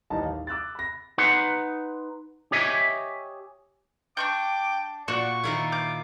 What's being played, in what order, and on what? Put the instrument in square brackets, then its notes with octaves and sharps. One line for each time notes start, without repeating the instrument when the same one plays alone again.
[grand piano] A1 D#2 G3 D#4 A5
F5
D6 E6 F#6 A6
B5 A#6
[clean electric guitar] D#4 B4 F#5 C6
G4 C#5 D#5 E5 G#5
[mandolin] D4 C#6 G6 [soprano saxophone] G5 [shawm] D6
[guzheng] A#2 [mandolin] F#4 F#6 [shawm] D5 [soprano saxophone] C#6
[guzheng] D#3 A#3 E4 [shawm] F4
[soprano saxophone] D6 [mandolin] G6